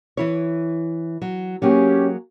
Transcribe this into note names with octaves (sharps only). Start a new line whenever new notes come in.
E3 E4 C#5
F#3
F#3 A#3 C#4 G4 G#4